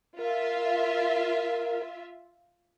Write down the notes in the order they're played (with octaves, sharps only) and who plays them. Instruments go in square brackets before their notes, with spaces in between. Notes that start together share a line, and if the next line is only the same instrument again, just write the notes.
[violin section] F4 E5 [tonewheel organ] A#4 F5